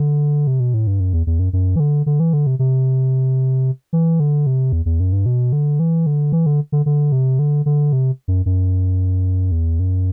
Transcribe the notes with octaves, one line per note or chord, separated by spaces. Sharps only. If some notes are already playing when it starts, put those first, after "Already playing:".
Already playing: D3
C3
B2
A2
G2
F#2
E2
E2
F#2
F#2
E3
D3
D3
E3
D3
C3
C3
E3
D3
C3
E2
E2
F#2
G2
B2
D3
E3
D3
E3
D3
D3
D3
C3
D3
D3
C3
F#2
F#2
E2
F#2